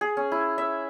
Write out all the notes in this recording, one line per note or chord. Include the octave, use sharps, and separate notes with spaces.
G#4
C#4
E4
E5